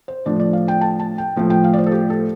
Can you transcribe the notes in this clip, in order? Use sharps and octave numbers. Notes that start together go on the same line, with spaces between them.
C5
A2 F3 D4 D5
D5
F5
G5
A5
A5
G5
A2 F3 A3
G5
F5
D5
C5
A4
G4
A4